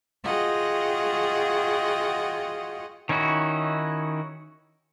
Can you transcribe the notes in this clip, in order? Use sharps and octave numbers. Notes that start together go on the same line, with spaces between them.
F4 F#4 G#4 D#5 F#5 G5
D#3 C#4 D#4 E4 F#4